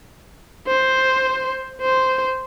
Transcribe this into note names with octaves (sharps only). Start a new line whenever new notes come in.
C5
C5